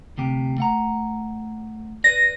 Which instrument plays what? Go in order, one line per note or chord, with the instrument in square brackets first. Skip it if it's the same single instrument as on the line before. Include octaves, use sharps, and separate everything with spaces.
[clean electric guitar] D2 C3 G4
A3 F#5 A#5
[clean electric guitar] B4 D5 [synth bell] A#6